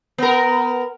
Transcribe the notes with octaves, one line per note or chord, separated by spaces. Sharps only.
B3 A#4